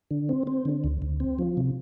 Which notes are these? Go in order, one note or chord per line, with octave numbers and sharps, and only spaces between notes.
D3
C4
C4
D3
D2
D2
C4
F3
C3